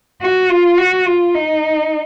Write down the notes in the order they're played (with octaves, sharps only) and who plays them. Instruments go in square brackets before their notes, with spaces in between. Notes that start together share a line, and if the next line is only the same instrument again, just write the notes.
[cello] F#4
F4
F#4
F4
D#4